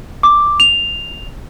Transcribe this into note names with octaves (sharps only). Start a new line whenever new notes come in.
D6
F7